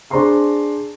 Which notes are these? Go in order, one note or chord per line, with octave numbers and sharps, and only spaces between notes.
D4 G#4 C5 A#5 C6 C#6